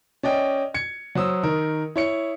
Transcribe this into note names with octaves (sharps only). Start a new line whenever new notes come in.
C#4 D5 D#5 G5
G#6 C#7
F#3 C5 D#6 E6
D#3 A#4
E4 C#5 C#7